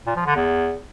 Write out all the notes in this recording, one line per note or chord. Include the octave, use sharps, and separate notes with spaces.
A#2
F3
D3
E2